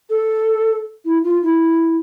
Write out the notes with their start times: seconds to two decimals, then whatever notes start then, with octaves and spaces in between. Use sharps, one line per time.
0.10 A4
1.05 E4
1.24 F4
1.43 E4